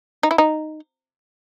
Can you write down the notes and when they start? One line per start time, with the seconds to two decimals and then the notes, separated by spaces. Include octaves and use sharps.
0.23 D#4
0.31 E4
0.38 D#4